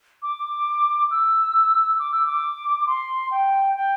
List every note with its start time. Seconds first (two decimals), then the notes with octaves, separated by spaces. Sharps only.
0.22 D6
1.11 E6
1.99 D6
2.12 E6
2.26 D6
2.87 C6
3.31 G5
3.76 G5